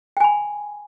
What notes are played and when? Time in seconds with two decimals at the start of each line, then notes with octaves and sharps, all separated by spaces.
0.17 G5
0.20 G#5
0.24 B5